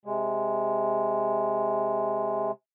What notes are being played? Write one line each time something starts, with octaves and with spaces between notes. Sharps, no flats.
C3 G#3